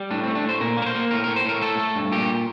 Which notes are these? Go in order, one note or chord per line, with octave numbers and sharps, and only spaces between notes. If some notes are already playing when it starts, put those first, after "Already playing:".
Already playing: G3
A2 D4
C4
A3
D4
A2 C5
A#2 A#4
A#3 A#4
C5
A#3
A2 A#4
A2 A#4
C5
A2 A#4
A3 A4
A3
G2
A#2 G4